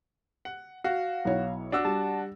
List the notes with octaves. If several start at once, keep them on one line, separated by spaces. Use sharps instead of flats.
F#5
F#4 F5
B1 E4 C#5
D4 F#4 E6
G3 A5